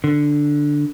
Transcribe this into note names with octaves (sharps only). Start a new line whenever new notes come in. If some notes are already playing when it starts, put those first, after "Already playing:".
D3